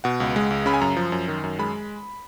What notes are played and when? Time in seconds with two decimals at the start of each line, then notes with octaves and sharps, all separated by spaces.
0.04 B2 F#5
0.20 C#2
0.36 G#3
0.51 C#2
0.66 C#3 B5
0.74 G#5
0.81 F#2 A#5
0.97 F3
1.12 F#2
1.28 D#3
1.44 F#2
1.59 G#3 B5